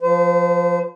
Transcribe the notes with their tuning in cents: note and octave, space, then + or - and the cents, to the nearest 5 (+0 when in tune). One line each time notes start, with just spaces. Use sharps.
F3 +5 C5 -35